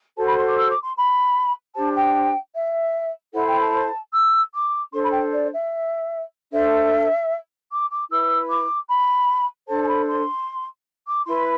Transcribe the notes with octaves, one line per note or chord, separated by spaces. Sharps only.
F#4 A4 C5 A5
B5
C6
D6
E6
D6
C6
B5
D4 G4 C5 A5
G5
E5
E4 A4 C5 F#5
G5
A5
E6
D6
D4 A4 C5 C6
B5
G5
D5
E5
D4 A4 C5 E5
D6
D6
E4 B4 E6
D6
B5
D4 A4 C5 A5
A5
B5
C6
D6
E4 B4 C6